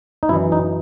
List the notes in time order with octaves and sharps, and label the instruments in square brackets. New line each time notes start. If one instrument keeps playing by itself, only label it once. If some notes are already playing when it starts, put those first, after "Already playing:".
[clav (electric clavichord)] D#4
F#2 E3 E4
D#4